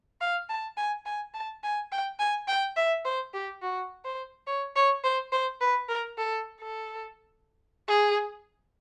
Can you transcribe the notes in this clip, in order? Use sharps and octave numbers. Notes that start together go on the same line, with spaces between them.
F5
A5
G#5
G#5
A5
G#5
G5
G#5
G5
E5
C5
G4
F#4
C5
C#5
C#5
C5
C5
B4
A#4
A4
A4
G#4